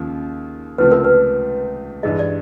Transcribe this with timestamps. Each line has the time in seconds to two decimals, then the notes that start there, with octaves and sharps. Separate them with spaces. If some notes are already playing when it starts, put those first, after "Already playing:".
Already playing: D#2 C#3 F3
0.78 C#2 C3 F3 A3 B4
0.92 A#4
1.04 B4
2.03 G2 E3 G#3 D#5
2.19 D5